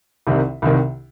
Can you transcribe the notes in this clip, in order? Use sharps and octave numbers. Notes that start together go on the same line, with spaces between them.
C2 C3 D#3
C2 C3 D#3